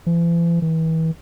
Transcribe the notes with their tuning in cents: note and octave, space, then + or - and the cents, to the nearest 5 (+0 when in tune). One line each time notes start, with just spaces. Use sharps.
E3 +45
E3 -35